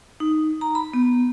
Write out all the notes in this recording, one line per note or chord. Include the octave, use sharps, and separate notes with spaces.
D#4
A#5
B5
B3